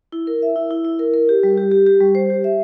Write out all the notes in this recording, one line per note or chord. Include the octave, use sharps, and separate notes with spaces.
E4
A#4
E5
E4
E4
E4
A#4
A#4
G4
G3
G4
G4
G4
G3
C5
G4
E5